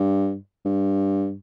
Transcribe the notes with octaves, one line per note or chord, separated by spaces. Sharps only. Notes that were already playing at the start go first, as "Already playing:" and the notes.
Already playing: G2
G2